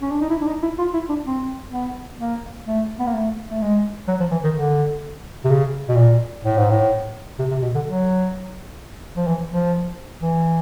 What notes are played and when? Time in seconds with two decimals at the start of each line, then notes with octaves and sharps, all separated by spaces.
0.02 C#4
0.11 D4
0.21 D#4
0.30 E4
0.42 D4
0.46 D#4
0.62 E4
0.78 F4
0.93 E4
1.09 D4
1.26 C4
1.72 B3
2.20 A#3
2.67 A3
2.99 B3
3.07 A#3
3.14 A3
3.51 A3
3.62 G#3
4.08 F#3
4.20 F3
4.31 E3
4.43 D#3
4.56 D3
5.45 C3
5.50 C#3
5.88 B2
5.97 A#2
6.44 A2
6.57 G#2
6.70 A2
7.39 C3
7.51 C3
7.62 B2
7.75 D3
7.86 F#3
9.17 F3
9.27 E3
9.51 F3
10.22 E3